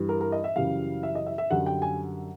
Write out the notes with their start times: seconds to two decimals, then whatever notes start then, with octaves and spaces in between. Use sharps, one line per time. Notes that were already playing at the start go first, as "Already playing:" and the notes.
Already playing: G2 E3 G3
0.09 A#4
0.21 A#4
0.32 D#5
0.44 E5
0.56 F#2 C#3 E3 G3 F5
1.03 E5
1.15 D#5
1.26 E5
1.38 E5
1.50 F#2 D3 G3 F#5
1.66 G5
1.82 G#5